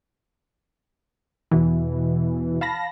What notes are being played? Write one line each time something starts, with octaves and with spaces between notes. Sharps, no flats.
E2 B2 E3
F5 A5 B5 A#6